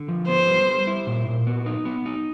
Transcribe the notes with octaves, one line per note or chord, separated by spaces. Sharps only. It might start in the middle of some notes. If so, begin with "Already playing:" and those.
Already playing: D3
F3
B3 C5
G3
G3
E4
A#2
A#2
B3
D#4
B3
D#4